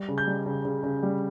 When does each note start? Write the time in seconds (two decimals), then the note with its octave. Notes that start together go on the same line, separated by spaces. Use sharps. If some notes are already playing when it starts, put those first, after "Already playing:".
Already playing: G3
0.08 C#3
0.18 G6
0.27 G3
0.46 C#3
0.65 C#3
0.84 C#3
1.03 G3